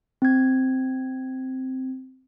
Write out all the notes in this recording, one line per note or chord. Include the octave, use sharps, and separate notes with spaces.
C4 G#6